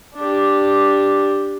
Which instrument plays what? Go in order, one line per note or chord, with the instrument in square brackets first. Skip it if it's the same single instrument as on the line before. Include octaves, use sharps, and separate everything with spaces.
[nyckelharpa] D4 G4